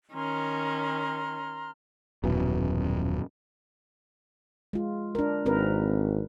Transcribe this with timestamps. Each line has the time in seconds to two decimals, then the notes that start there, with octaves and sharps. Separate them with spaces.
0.13 D#3 C#4 A#5 C6 F6
2.24 D#1 F#2 B2 E3
4.73 G#3 F4
5.15 D4 A#4
5.46 G#1 C4 A#4 B4